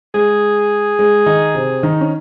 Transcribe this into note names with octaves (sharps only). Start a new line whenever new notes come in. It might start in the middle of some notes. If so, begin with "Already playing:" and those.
G#3 G#4
G#3
D#3 D#4
C3 C4
D#3 D#4
C#4